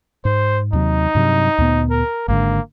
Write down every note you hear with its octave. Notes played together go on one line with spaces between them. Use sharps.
G#2 C5
D#2 C3 F#3 D#4
G2 C3 F#3
D2 A#2 B3
A#4
G#1 G#2 D3 A#3